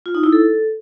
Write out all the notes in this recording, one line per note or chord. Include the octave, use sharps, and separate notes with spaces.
F4
D#4
E4
A4